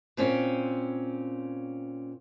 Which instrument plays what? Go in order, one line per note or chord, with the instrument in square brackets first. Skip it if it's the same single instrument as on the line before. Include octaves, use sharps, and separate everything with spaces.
[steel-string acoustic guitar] A#2 C4 C#4